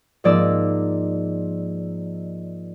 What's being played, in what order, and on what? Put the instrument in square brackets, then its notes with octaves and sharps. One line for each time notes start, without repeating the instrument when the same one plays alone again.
[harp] G#2 F3 A#3 D5 D#5 E6